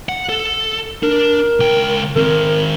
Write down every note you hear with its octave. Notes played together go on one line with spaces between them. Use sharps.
F#5
A4
D4 A#4
C#2 G5
D#3 C4 A#4